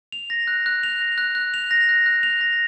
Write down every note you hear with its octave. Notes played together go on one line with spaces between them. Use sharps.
F7
A#6
F#6
F#6
F7
A#6
F#6
F#6
F7
A#6
F#6
F#6
F7
A#6